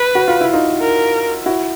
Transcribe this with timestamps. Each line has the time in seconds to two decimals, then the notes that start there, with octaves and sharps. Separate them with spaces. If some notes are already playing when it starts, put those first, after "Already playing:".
Already playing: B4
0.15 F#4
0.28 F4
0.41 E4
0.53 D#4 F4
0.80 A#4
1.46 E4 F#4